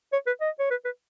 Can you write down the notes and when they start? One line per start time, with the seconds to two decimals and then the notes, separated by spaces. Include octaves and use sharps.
0.13 C#5
0.27 B4
0.41 D#5
0.59 C#5
0.70 B4
0.85 B4